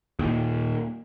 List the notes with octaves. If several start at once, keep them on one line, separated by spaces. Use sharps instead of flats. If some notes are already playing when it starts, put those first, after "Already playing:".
D#2 A#2